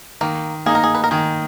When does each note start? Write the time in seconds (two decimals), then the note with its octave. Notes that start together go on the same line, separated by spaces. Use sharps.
0.21 D#3 A#3
0.66 A#3 D#4 G#4
0.75 A#4
0.84 G#4
0.95 B4
1.04 A#4
1.11 D#3 G#4